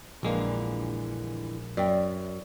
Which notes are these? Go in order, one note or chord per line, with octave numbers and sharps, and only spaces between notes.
A#1 F2 D3 E3 G#3 A#3
F#2 D5 E5 G5